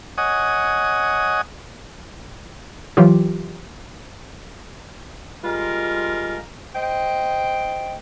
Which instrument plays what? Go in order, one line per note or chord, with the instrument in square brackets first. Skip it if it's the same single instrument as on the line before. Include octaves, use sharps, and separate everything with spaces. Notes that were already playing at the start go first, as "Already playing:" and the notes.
[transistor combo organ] C#5 D#5 F#5 G#5 D#6
[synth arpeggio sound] E3 F#3 F4 G4
[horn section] G3 G#3 F4 A#4
C5 D#5 G5